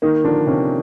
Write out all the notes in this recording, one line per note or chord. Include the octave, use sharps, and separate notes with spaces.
D#3 A#3 D#4
D3 F3 D4
C3 C#4